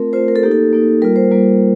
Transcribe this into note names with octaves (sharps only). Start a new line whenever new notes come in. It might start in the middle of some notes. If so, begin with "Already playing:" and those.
Already playing: A3 C4 F4 A#4
A3 C4 F4 C5
A#4
A4
A#3 D#4 G4
A4
A#3 D#4
G3 A#3 F4 A#4
C5
G3 A#3 F4